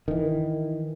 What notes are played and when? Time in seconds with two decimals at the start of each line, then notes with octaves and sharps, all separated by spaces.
0.08 D#3 E3